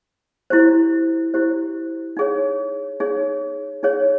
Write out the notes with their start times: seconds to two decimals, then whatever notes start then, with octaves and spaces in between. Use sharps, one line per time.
0.50 E4 G4 C5
1.34 E4 G4 C5
2.17 D#4 G#4 C#5
3.00 D#4 G#4 C#5
3.83 D#4 G#4 C#5